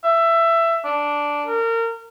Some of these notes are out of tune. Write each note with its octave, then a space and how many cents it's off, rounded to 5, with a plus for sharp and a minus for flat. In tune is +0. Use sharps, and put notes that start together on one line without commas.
E5 +15
D4 -5
A#4 -30